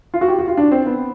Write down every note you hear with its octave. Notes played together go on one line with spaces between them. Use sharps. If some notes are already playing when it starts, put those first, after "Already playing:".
F4
F#4
G4
F#4
F4
D4
C4
B3